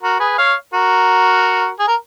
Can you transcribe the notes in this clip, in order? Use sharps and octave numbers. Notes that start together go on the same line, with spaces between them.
F#4 A#4
G#4 B4
C#5 F5
F#4 A#4
G#4
A#4